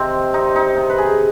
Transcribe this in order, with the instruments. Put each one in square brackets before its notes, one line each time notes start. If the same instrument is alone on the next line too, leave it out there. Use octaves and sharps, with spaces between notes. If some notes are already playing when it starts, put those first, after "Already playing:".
Already playing: [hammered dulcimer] C3 D#3 C4
C3 D#4
D#4
C3
B4
G#4